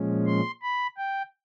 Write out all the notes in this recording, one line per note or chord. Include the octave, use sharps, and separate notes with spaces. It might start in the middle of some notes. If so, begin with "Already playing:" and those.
Already playing: A#2 F3 G#3 C#4
C6
B5
G5